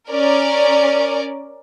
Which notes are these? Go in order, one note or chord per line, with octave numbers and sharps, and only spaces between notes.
C#4 A#4 D5